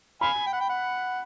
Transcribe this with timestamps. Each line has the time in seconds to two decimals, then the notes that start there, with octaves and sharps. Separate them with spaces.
0.21 F5 G#5 B5
0.46 G5
0.53 F#5
0.61 G5
0.69 F#5